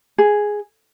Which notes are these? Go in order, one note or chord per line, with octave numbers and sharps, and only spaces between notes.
G#4